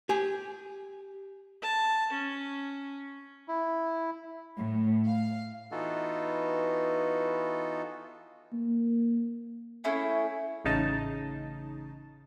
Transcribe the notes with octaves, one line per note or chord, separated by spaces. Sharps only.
G4 G#5
A5
C#4
E4
A2
F5
E3 B3 D#4 F4 F#4 A4
A#3
A3 C#4 E4 G#4
A1 C#3 D#4 A5